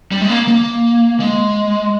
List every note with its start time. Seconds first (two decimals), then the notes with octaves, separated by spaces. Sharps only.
0.12 G3
0.21 G#3
0.29 A#3
0.48 A#3
1.20 G#3